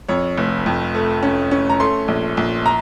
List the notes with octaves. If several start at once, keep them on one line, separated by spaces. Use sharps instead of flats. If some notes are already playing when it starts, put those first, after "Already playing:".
F2 C#5
F1
F2
A3
C#4
C#4
A#5
A3 C6
A#1
A#1
A#5